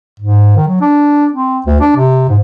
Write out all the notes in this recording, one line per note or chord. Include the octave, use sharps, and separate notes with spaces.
G#2
D#3
F#3
D4
C4
D2
D4
C3
G#2